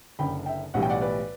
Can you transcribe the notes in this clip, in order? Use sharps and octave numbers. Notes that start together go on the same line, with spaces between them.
F#1 F#2 D3 G5 B5
E5 G5
B1 A2 E3 G3 F#5
G5
D5 F#5
B4 D5